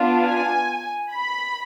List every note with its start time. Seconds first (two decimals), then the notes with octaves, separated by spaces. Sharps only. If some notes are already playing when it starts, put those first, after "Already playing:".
Already playing: B3 D4 F4
0.24 G#5
1.12 B5